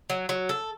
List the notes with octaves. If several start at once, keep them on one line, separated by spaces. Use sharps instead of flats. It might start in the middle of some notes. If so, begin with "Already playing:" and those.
F#3
F#3
A4